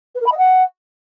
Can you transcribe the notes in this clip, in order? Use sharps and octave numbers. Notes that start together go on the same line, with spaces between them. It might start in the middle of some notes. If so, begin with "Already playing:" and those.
B4
A#4
B5
D#5
F#5